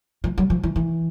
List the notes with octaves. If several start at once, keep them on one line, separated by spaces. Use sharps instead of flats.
F3
F#3
F3
E3
E3